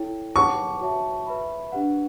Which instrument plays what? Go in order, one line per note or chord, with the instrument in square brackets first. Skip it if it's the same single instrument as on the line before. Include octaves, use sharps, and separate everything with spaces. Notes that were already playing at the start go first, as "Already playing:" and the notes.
Already playing: [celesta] E4 A4 C#5 G5
[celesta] G4 C#5 F#5 A5 D6 [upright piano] C#6
[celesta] F#4 C#5 E5 A5
B4 E5 B5
D4 G4 B4 F#5